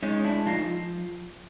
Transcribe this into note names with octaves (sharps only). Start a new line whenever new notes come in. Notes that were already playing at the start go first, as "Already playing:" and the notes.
G#3 C#4 D#4
D4 E4
F3 D#4 F4